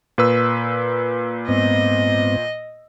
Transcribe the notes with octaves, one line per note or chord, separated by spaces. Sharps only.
A#2 B4 E6
G#2 B3 C4 D#5